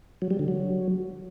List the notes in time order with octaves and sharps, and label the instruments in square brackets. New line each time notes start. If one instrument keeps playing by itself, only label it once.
[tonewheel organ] F#3
G3
D3
F#3